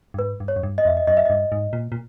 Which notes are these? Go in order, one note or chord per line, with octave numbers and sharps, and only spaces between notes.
G2
G#2 B4
G2
C#5
F#2
G2
D#5
F2 E5
D#5
F#2 D#5
E5
G2 D#5
G#2
A#2
A#2